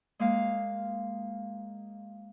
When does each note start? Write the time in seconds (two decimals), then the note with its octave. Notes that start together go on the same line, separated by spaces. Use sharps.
0.19 G#3 A#3 F5